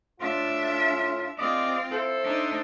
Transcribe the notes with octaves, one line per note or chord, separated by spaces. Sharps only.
A2 D4 F4 E5
C4 F4 G#4 D5 D#5
E4 A4 C5
D4 D#4